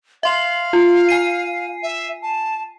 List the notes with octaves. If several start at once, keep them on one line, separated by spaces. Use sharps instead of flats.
E5 F5 C6 F#7
F4
G#5 C7 D#7
E5
A5